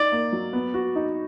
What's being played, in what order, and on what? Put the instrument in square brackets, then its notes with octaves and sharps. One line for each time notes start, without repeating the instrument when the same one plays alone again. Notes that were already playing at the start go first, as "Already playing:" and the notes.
Already playing: [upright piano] D#4 [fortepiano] D5
[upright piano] A#3
F#3
B3
F#4
D#4